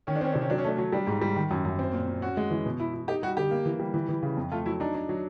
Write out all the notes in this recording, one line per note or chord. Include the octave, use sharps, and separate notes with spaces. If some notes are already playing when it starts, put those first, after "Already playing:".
D#3 C#4
D4
C4 C#4
C3 D4
C#4
F#3 D4
C#4
A3 D4
C#4
F#3
G3 D4
G#2
G3
D#3
F#2
F#2
C4
A#2
A#2
C#4 F#4
G#3
E3
B2
E4
E4
D#4 G4
G3 F#4
D3 G4
A#3
E3
G3
E3
E3
C#3
F2
A3 F4
F#3 E4
D4 D#4
D4
F#3